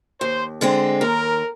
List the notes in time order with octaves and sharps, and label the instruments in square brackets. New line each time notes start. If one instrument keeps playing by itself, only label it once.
[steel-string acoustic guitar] D#2 [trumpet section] C5
[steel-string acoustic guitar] D3 G#3 C4
[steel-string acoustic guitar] D#2 [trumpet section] A#4